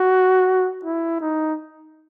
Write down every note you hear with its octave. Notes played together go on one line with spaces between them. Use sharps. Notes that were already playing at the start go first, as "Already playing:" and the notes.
Already playing: F#4
E4
D#4